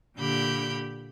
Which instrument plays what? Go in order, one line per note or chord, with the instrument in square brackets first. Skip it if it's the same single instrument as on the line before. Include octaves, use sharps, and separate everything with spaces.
[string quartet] A#2 D3 G4 B5 G6